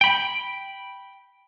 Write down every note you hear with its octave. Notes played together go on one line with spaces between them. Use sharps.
G5 B5